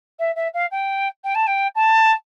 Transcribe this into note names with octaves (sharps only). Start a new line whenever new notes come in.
E5
E5
F5
G5
G5
A5
G5
A5